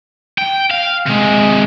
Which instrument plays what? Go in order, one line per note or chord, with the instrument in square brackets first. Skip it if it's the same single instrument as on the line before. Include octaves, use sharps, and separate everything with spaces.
[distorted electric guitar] G5
F5
C3 G#3